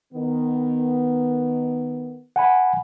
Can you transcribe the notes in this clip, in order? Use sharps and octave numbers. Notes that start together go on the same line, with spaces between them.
D#3 B3
F#5 G#5 B5